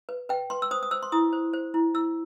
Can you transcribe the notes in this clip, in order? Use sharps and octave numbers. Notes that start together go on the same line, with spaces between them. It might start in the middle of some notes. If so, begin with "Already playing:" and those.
B4
B4 G5
B4 C6
E6
C5 D#6
D#6
C5 E6
C6
E4 D#6
C5
C5
E4
E4 E6